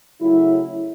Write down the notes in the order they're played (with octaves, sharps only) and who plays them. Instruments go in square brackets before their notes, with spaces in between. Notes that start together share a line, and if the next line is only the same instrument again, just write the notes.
[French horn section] C#3 F#3 A3 E4